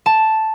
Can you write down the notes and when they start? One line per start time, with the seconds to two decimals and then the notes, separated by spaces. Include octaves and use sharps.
0.06 A5